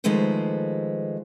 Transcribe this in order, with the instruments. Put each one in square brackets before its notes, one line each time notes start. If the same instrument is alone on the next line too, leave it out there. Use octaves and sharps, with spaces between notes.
[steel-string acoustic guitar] D#3 F3 G#3 A3 B4 C5